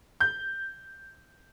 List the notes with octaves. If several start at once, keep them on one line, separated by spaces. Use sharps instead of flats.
G6